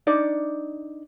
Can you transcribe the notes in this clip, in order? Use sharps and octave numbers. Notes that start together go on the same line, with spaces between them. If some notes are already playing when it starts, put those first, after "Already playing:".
D4 D#4 D5